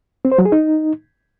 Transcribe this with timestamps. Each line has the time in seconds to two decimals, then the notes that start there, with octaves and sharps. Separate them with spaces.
0.25 C4
0.32 C5
0.38 F#3
0.45 G#4
0.52 D#4